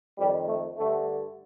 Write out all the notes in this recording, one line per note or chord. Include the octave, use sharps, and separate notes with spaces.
F2 D#3 G3
A3
G2 D3 A3